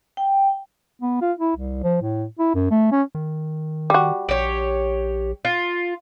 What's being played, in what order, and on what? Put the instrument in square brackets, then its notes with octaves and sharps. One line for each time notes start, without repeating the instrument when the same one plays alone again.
[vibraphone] G5
[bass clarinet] B3
F4
E4
C2
F3
A2
E4
F#2
A3
C#4
[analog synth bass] D#3
[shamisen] G3 F#4
[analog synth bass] A#1 [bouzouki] G4 C#5
[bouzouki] F4